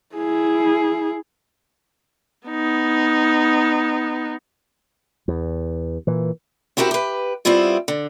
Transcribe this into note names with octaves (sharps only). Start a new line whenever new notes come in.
E4 G#4
B3 D#4
E2
A#2 E3
C4 E4 F#4 G4 A#4
G4 B4
G3 B3 C4 E4 F4
D3